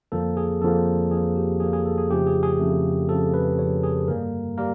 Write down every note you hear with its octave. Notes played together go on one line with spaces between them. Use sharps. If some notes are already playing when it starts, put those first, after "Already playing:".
F2 D3 F3 A#3 A4
G#4
F2 D3 F3 A#3 A4
F2 D3 F3 A#3 G#4
G4
F2 D3 F3 A#3 G#4
G#4
A4
G#4
F2 C#3 F3 A3 G4
G#4
G#4
F2 C#3 F3 A3
F2 C#3 F3 A3 A4
B4
F2 C#3 F3 A3 C#5
G#4
G2 D3 G3 A#3 A#4
G3 A#3 A#4